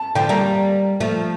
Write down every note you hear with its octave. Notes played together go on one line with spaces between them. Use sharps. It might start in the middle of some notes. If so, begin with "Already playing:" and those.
Already playing: A5
D3 F3 G5
G3 A#3 A#5
F3 A3